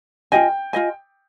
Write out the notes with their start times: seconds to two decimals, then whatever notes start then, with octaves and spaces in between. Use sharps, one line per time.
0.32 F4 G#4 D#5 G5 G#5
0.73 F4 G#4 D#5 G#5